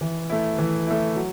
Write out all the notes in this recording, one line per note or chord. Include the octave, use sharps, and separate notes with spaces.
E3
A3 E4
E3
A3 E4
F#3